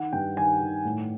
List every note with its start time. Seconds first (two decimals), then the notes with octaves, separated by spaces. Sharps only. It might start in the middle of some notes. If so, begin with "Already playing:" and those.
Already playing: D#3 F#5
0.13 G2 G5
0.37 D#3 G#5
0.61 D#3
0.85 A2